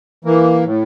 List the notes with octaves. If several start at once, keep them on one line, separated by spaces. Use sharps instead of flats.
E3 A#3
A2